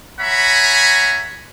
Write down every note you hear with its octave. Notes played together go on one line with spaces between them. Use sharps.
C#5 E5 F#5 G#5 A#5 B5